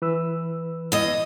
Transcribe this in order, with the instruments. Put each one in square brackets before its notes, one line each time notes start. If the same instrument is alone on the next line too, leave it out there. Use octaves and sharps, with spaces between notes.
[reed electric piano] E3 B4 E6
[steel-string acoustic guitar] E2 D#5